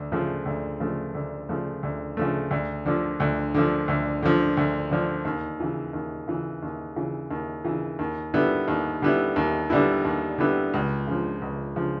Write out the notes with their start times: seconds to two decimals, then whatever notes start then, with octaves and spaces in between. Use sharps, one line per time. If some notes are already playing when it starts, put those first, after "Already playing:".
Already playing: D2
0.12 C#3 F3 A3
0.46 D2
0.80 C#3 F3 A3
1.15 D2
1.49 C#3 F3 A3
1.83 D2
2.17 C#3 F3 A3
2.51 D2
2.86 D3 F3
3.20 D2
3.54 D3 F3
3.88 D2
4.23 D3 F3
4.57 D2
4.91 D3 F3
5.25 D#2
5.60 C#3 E3
5.93 D#2
6.28 C#3 E3
6.63 D#2
6.96 C#3 E3
7.31 D#2
7.65 C#3 E3
7.99 D#2
8.34 D3 G3 B3 E4
8.68 D#2
9.02 D3 G3 B3 E4
9.36 D#2
9.70 D3 G3 B3 E4
10.05 D#2
10.38 D3 G3 B3 E4
10.74 C#2
11.07 C#3 F3
11.42 C#2
11.76 C#3 F3